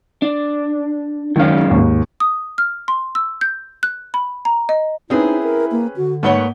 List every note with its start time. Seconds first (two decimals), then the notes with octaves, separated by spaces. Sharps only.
0.22 D4
1.36 C#2 F#2 D#3 C#4 F5
1.71 D#2 G#2
2.20 D#6
2.58 F6
2.88 C6
3.15 E6
3.41 G6
3.83 F#6
4.14 B5
4.45 A#5
4.69 D#5
5.10 C4 C#4 D#4 E4 G#4 B4
5.43 A#4
5.71 A#3
5.96 D3 F#4
6.23 G#2 A3 A#3 B4 C#5 F#5 G7